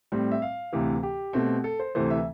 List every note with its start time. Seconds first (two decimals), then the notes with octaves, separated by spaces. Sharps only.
0.12 A2 G3 C4
0.31 E5
0.42 F5
0.73 D2 C3 E3
1.03 G4
1.33 B2 A3 C4
1.64 A4
1.80 C5
1.95 D2 C3 E3 A3 C5
2.10 E5